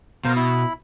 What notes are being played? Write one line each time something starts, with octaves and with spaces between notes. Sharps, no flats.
B2 A#4 C5 F5
E4 B5